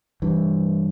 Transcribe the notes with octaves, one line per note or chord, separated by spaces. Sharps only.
G2 E3